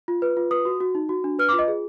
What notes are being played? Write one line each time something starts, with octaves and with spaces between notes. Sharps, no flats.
F4
B4
F4
B4 D#6
F#4
F#4
D#4
F#4
D4
B4 F6
D6
F4
D#5
G#4